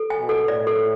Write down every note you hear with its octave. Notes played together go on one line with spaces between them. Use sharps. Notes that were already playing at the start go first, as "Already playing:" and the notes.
Already playing: A4
G#5
B2
A4
A2 D5
A4